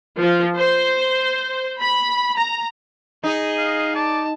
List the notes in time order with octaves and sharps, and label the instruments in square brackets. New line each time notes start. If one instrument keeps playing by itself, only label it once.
[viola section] F3
C5
B5
A#5
[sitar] D#4 [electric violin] G#4 D#5
[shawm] F5
[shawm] D5 [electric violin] A5